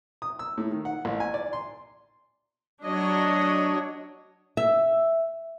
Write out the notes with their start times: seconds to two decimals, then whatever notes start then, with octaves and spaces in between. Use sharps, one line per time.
0.22 D#6
0.39 E6
0.57 A2
0.71 D#3
0.85 F#5
1.05 A1
1.20 G#5
1.34 D5
1.53 C6
2.84 F#3 D4 C#5 D#5
4.57 E5